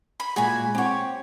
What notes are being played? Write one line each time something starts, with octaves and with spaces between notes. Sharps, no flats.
B5
A#2 G#3 F#4 G#4 G#5 B5
C4 G4 C#5 F#5